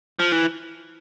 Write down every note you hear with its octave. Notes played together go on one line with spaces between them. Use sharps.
F3
E3